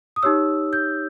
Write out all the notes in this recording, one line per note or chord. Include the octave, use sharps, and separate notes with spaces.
D#6
D#4 G4 C#5 E6
G6